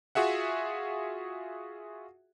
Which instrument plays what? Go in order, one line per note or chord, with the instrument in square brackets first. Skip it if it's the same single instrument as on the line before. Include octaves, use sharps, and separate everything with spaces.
[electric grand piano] F4 F#4 G#4 E5 F#5